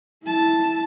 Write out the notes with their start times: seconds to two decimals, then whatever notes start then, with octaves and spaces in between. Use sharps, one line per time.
0.24 E4 A5